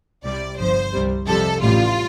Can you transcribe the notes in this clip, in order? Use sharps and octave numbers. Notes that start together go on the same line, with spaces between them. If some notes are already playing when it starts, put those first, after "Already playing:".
C2 C3 G3 D5
G1 G2 F3 C5
C2 C3 G3
F2 C3 G3 A4
A1 A2 G3 F4